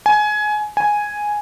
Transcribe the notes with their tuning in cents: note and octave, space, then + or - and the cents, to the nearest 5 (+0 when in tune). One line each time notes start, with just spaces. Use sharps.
G#5 +20
G#5 +0